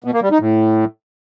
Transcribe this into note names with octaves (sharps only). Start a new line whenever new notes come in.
B2
A#3
G3
D#4
A2